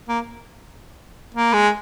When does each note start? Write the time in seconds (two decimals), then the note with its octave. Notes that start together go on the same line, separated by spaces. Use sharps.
0.09 A#3
1.35 A#3
1.53 G#3